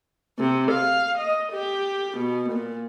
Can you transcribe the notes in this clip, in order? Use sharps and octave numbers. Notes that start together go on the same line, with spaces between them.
C3
F5
D#5
G4
B2
A#2